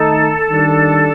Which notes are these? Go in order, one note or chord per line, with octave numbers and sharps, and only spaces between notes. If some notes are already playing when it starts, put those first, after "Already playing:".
Already playing: D#3 A3 D#4 A4
D#3 G3 D4